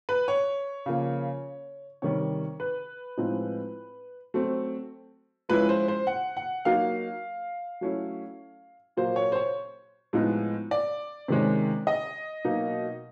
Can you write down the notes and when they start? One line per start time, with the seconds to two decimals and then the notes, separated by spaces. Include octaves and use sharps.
0.09 B4
0.28 C#5
0.86 C#3 F3 A#3
2.02 C3 D#3 G3 C#5
2.60 B4
3.17 A2 F3 G#3 C4 D#4
4.34 F#3 A3 C4
5.49 F3 G#3 C#4 E4 B4
5.69 C5
5.88 C5
6.07 F#5
6.37 F#5
6.65 F#3 A#3 D#4 F5
7.81 F#3 A3 C#4 E4
8.97 A#2 F#3 A#3 C5
9.16 C#5
9.32 C5
9.36 C#5
10.13 A2 F3 G#3 B3 D#4
10.71 D5
11.28 C3 D#3 G#3 C#4
11.87 D#5
12.45 B2 F#3 A#3 D#4